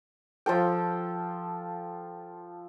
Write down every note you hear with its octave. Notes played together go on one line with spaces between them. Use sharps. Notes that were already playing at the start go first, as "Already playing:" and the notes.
F3 F4 A4 G5